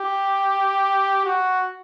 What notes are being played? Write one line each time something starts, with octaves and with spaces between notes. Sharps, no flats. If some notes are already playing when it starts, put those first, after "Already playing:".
Already playing: G4
F#4